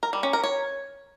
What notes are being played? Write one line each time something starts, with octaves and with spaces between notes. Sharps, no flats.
A#4
G3
C#4
A#4
C#5